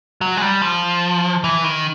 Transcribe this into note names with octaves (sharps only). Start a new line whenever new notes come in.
F#3
G#3
G3
F3
E3
D#3